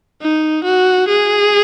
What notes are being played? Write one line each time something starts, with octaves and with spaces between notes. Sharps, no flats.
D#4
F#4
G#4